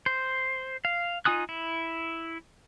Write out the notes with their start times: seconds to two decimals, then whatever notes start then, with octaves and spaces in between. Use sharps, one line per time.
0.06 C5
0.85 F5
1.25 D#4 F4 G#5 D#6 F#6
1.49 E4